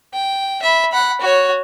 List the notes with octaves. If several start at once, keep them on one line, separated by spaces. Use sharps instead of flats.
G5
E5 B5
F#5 B5
F#4 C#5